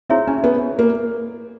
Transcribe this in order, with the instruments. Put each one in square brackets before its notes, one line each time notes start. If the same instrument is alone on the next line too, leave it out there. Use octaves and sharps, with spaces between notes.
[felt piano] C4 [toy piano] E4 G#4 C#5 E5
[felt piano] C#4
B3
A#3